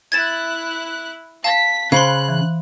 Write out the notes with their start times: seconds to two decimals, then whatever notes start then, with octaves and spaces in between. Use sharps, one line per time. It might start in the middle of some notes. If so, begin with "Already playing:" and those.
0.12 E4 F#6 G#6 A6 E7
1.44 F5 A5 B6
1.92 C#3 C5 F5 B5 C6 F#6
2.29 E3